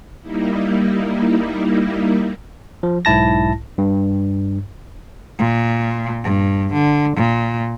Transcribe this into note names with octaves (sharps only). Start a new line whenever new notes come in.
G3 A#3 D#4 E4
F3
B1 G#2 E4 A5 A#6
G2
A#2
G2
D3
A#2